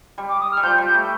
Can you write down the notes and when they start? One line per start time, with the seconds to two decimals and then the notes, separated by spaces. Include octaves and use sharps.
0.18 G3
0.29 D6
0.40 D#6
0.51 F6
0.57 G3
0.63 F3 G6
0.78 G3
0.86 G6
0.94 A3